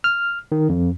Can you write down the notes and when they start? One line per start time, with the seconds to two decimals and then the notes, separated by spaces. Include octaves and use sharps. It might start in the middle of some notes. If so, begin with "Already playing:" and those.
0.04 F6
0.52 D#3
0.69 F2